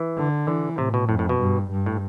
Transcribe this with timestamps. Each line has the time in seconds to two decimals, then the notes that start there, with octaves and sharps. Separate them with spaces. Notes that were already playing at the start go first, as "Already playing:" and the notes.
Already playing: E3
0.17 D3
0.47 D3 E3
0.78 A2 C3
0.94 B2
1.09 F2 A2
1.19 A2
1.29 B2
1.40 G2
1.71 G2
1.86 A2